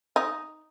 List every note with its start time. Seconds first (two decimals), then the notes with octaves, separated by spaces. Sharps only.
0.16 D#4